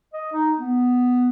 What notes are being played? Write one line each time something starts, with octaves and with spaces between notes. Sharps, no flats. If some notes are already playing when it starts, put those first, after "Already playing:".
D#5
D#4
B3